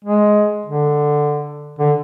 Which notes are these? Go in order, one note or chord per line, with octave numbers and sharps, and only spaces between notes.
G#3
D3
D3